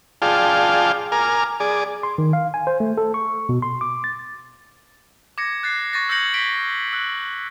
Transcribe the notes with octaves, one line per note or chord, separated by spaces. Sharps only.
F4 G#4 D5 F5 G5 A5
A#4 G#5 D6 F6
G#4 D5
C6
D#3
F5
G#5
C5
A3
A4
C#6
B2
C6
D6
A6
D6 G#6 A#6 C#7
F#6 A6 C7
C#6 A6 A#6
E6 G6 G#6 A#6 C#7 F#7
B6 C#7 D7 G7
E6 F#6